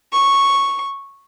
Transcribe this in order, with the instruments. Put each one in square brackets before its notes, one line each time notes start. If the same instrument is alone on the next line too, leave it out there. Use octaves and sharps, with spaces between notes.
[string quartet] C#6